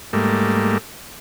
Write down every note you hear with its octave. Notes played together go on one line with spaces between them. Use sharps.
G#2 G3 A3 A#3